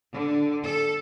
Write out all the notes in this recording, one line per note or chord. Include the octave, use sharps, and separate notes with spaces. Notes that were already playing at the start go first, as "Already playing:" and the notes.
D3
A4